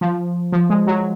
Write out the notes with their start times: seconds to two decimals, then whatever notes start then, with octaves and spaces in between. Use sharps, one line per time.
0.01 F3
0.53 F3
0.70 G#3
0.87 F#3